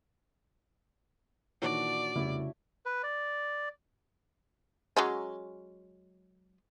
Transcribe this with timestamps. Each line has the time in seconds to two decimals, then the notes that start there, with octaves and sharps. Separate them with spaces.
1.62 A#2 D#3 E3 D4 F#4 C#5 D5
2.16 F1 C2 C#3 E4
2.86 B4
3.03 D5
4.97 F#3 G#3 C#4